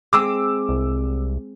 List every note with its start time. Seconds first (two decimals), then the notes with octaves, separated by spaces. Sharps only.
0.13 G#3 C4 D6 E6
0.69 C2